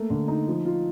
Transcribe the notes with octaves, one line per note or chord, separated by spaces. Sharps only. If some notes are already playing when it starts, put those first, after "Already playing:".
Already playing: A3 A#3
D3
D#4
F3
F4